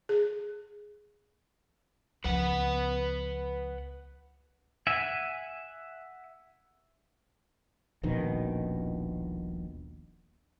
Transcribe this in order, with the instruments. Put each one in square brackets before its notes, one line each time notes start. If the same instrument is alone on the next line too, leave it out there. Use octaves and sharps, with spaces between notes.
[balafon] G#4
[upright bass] C#2 F3 [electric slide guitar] B4 F#5
[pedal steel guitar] E5 F#5 G#5
[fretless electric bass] D#1 A#1 B2 D#3